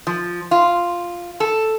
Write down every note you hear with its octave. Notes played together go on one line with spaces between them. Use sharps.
F3
F4
A4